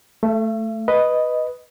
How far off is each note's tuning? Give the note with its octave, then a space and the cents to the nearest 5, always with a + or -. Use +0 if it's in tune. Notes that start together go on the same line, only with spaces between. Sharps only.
A3 +0 E5 +45
B4 +0 D#5 +0